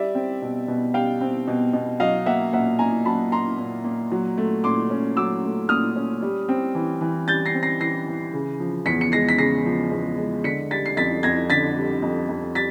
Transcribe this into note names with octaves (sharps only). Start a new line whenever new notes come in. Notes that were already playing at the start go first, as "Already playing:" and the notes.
Already playing: G3 D5 E5
C4
B2
B2
G3 F5 G5
C4
B2
B2
F#3 D#5 F5
A#3 E5 F#5
A#2 E5 F#5
A#2 G#5 A#5
F#3 A5 B5
A#3 A#5 C6
A#2
A#2
F#3
A3
A#2 C6 D6
C#4
F#3 D6 E6
A3
A#2 D#6 F6
C#4
G3
C4
E3
E3
G3 G6 A6
A#6 C7
C4
A#6 C7
E3 A#6 C7
E3
C#3
F3
E2 B6 C#7
C#7
G#3 A#6 C7
B6
C#3 A#6 C7
F3
E2
G#3
D3 B6 C#7
G3 A6 B6
C7
F2 A6 B6
F2 G#6 A#6
D3 A6 B6
G3
F2
F2
G3 A6 B6